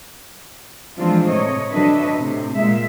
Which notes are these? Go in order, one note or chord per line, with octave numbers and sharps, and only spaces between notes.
E3 F3 G#3 C4 D4 F4
A2 C3 C#5 D#5
D3 F#3 D4 B4 D#5 E5
A2 C3
A#2 G#3 E5